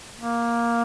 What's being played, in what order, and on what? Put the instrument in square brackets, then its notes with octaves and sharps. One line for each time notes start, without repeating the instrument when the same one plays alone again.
[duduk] A#3